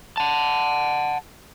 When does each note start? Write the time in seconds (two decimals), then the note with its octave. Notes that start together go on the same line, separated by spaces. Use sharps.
0.17 F#5 A5